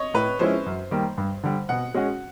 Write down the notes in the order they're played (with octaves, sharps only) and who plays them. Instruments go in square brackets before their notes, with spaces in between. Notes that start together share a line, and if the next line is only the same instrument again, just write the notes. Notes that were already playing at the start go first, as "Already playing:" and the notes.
Already playing: [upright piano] C#5 D#5
[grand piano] A2 [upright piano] B4
[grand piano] F3 G#3 C#4 E4 [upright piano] C5
[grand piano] F#2
D#3 G3 A#3
G2
D3 G3
[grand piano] B2 [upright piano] F#5
[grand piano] G#3 C#4 F#4